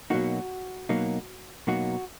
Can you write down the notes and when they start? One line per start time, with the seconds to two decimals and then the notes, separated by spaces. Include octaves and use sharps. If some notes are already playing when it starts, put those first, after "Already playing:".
0.10 B2 F#3 A#3 D#4 F#4
0.89 B2 F#3 A#3 D#4
1.67 B2 F#3 A#3 D#4 F#4